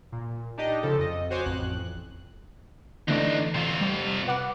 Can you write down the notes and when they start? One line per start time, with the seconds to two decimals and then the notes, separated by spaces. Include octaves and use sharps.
0.12 A#2
0.58 D4 D#4 G4 D#5
0.83 C#3 F3 A4
0.99 F2 D#5
1.30 F#4 C5 C#5 G#5 D6
1.45 A1 F2 F#6
3.08 D3 E3 A3 D4 D#4
3.54 C3 F4
3.81 G3
4.27 B4 F#5 D6